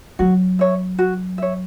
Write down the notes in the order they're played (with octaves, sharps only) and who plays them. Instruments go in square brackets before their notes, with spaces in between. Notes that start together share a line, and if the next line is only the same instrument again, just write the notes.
[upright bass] F#3 [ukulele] F#4
[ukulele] C#5 E5
F#4
C#5 E5